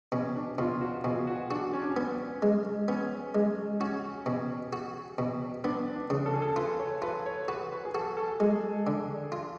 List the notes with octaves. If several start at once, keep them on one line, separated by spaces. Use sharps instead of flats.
B2 C#4
D4
B2 F4
F#4
B2 G#4
F#4
D4 F#4
C#4
D4
C#4
B3
G#3
B3 C#4
G#3
C#4 F#4
B2
F#4
B2
B3 D4
D4
C#3
A4
G#4
A4
F4 B4
C#5
F4 B4
C#5
F#4 B4
B4
G#4
F#4 A4
A4
G#3 G#4
D3
F4